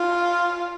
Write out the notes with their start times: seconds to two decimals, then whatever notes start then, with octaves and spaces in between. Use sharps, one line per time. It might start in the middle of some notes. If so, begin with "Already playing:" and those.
Already playing: F4